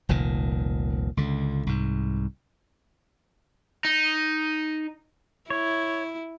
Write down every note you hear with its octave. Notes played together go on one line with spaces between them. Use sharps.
F1 C2 A#2 D#3
C#2 D3
C2 G#2
D#4
E4 C#5